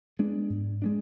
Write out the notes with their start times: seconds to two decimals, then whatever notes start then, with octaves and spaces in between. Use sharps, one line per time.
0.19 G#3 B3 D4
0.50 G#2
0.82 G#3 B3 D4